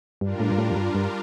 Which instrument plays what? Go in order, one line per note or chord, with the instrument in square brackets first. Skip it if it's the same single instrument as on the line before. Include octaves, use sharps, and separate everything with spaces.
[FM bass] G2 [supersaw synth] G3 D4 F4 A#4
[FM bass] A2
G2
A2
F2
G2
G2